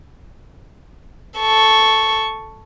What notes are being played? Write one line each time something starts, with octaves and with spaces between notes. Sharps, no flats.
A4 C#6